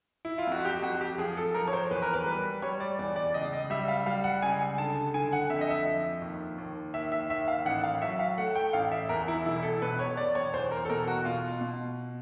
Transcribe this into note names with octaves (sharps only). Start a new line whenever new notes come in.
E4
F4
F2 F#4
G4
F2 F#4
G4
F3 G#4
A4
F3 A#4
C#5
C5
E2 B4
A#4
B4
G3 B4
G3 C#5
D5
E2 D5
D5
C#2 D#5
D#5
G3 E5
F5
G3 F5
F#5
C#2 G#5
D3 A5
D3 G#5
F#5
F2 E5
D#5
E5
F3
D#2
D#2
D#2 E5
E5
D#2 E5
F5
A1 F#5
F5
F#3 E5
F5
A3 F#5
G5
A1 F5
E5
E2 A#4
E4
E1 E4
A4
B2 B4
C#5
E1 D5
C#5
E2 C5
A#4
A4
B2 A#4
F#4
B2 F4
B2